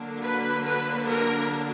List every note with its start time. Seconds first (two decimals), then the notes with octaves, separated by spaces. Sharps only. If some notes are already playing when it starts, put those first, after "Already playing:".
Already playing: D3 F#3 A#3 D4
0.23 B4
0.64 B4
1.05 A#4